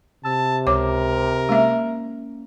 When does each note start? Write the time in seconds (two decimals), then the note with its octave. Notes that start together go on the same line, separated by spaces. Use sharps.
0.25 C3 A5 E6
0.67 C#2 A#4 C#5 D6
1.49 G#3 A#3 C#4 E5